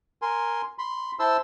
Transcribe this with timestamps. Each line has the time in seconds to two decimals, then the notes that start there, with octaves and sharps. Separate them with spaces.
0.22 A#4 G#5 C6
0.79 B5 C6
1.19 E4 C5 A5 C6 E6